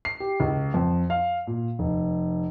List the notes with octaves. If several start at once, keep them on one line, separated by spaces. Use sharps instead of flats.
C7
G4
C#2
F2
F5
A#2
F1